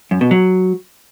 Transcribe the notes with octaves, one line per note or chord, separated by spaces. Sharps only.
F#2
B2
F#3